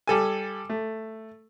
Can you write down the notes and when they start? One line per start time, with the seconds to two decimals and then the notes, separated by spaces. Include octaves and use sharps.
0.07 G3 A4 G#5
0.70 A3